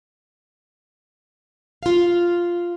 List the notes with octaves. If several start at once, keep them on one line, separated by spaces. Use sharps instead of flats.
F4 F5